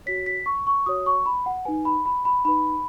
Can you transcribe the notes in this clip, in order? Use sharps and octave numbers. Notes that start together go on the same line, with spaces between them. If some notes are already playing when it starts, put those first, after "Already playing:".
F#4 C#5 B6
B6
C#6
C#6
F#4 C#5 D#6
C#6
B5
F#5
D#4 B4 G#5
B5
B5
B5
D#4 B4 B5